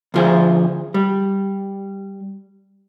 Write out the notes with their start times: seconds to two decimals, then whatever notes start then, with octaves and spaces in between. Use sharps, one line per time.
0.14 D2 F3 G#4
0.94 G3